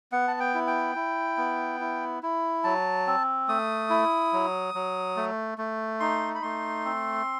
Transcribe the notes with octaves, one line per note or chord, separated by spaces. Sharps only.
B3 F#5
A5
G5
E4
G5
E4
B3
E4
E4
F#3 A5
C4
A3 D#6
E4
F#3
F#3
A3
A3
D#4 C6
B5
A3 C6
C4